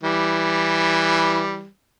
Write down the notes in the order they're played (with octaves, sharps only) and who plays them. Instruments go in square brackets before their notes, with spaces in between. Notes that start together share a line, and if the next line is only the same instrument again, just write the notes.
[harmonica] E3 G3